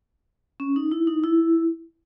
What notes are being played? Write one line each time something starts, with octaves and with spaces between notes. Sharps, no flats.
C#4
D#4
E4
D#4
E4